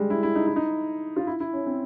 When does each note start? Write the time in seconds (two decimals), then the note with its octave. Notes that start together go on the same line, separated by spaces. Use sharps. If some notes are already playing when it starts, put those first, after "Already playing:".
Already playing: G3 G#3
0.10 E4
0.23 E4
0.35 D#4
0.47 E4
0.56 D#4
1.16 F4
1.27 E4
1.40 E4
1.53 C#4
1.66 C4